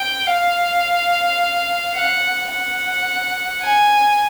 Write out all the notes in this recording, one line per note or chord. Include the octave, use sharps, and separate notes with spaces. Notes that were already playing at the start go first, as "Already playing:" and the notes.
Already playing: G5
F5
F#5
F#5
G#5